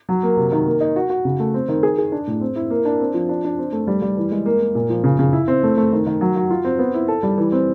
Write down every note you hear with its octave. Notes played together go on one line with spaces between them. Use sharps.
F#3
A#3
C3
D#3
A#3
D#4
F#4
F#4
C#3
A3
C4
D#3
G#4
G#4
D4
A2
C4
E4
A#3
D4
C4
F3
D4
D4
C4
A3
G3
G3
E3
G#3
A#3
A#3
A#2
F3
C#3
C#3
E4
C4
A3
A3
D#3
D#3
F#3
F#4
F4
C4
B3
E4
A4
G3
E3
C4